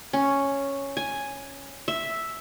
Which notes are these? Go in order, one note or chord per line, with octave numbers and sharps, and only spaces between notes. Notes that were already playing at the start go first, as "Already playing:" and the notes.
C#4
G#5
E5